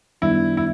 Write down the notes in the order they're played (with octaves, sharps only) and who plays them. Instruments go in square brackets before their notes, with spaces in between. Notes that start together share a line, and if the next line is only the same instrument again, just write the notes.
[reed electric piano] F#2 D#3 G3 B3 D4 [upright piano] E4
[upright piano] E4